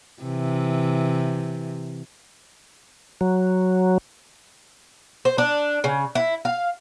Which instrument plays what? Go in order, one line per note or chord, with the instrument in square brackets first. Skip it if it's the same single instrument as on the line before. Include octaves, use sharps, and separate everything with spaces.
[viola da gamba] C3 E3
[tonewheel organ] F#3
[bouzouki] C5
D4
C#3
E4
F5